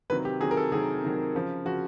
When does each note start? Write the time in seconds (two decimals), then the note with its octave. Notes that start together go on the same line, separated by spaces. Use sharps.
0.10 C3 D#3 F#3 B4
0.25 G4
0.40 C3 D#3 F#3 G#4
0.51 A#4
0.57 A4
0.72 C3 D#3 F#3 G#4
1.03 C3 D#3 F#3
1.35 C#3 F3
1.65 C#3 F3 F#4